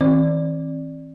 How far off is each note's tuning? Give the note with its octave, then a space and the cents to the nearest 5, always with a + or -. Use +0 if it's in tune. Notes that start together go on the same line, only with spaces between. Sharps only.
D#3 +45 C4 +35 D5 +0